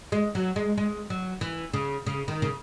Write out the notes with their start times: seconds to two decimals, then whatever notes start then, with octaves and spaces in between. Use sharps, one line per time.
0.12 G#3
0.35 F#3
0.56 G#3
0.78 G#3
1.10 F#3
1.41 E3
1.73 C#3
2.06 C#3
2.28 D#3
2.42 C#3